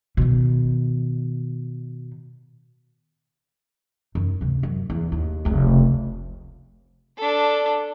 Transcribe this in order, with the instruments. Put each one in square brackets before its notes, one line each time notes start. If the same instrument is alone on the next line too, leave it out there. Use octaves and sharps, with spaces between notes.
[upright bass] B2 D#3
F#2 D#4
D2 C3
F#2
E2
D#2
F1 C#2
[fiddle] D4 A4